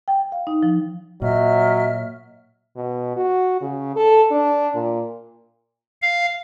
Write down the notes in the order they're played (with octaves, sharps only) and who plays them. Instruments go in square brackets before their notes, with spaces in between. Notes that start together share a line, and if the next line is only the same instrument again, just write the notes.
[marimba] G5
F5
D#4
F3
[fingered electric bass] A#2 [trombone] F#3 [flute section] D#5 E5 F6
[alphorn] B2
F#4
C#3
A4
D4
A#2
[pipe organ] F5